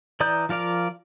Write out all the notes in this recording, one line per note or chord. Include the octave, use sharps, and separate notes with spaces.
E3 D5 A#5 D#6 G6
F3 F4 A#4 D5 F5